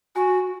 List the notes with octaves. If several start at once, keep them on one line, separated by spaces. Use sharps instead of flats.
F#4 G#5